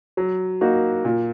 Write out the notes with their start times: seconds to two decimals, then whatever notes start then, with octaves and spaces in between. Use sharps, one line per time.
0.17 F#3
0.61 A#3 D#4 F#4
1.05 A#2